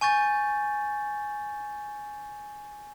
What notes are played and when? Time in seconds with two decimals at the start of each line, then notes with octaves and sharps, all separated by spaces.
0.01 G#5 C#6 G6 A6